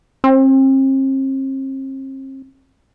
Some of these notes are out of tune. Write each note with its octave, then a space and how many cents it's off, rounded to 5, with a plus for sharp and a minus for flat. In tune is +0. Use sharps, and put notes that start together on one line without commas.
C4 +40